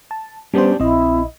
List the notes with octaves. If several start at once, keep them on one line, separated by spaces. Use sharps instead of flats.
A5
G3 B3 C#4 D4 G4 C5
A#1 C4 E4 D#5